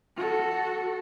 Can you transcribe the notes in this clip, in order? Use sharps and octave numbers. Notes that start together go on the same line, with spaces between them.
F#4 A4